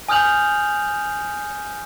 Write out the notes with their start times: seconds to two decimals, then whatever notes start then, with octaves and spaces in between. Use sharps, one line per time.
0.09 G#5 D#6 F6 G6 F7 F#7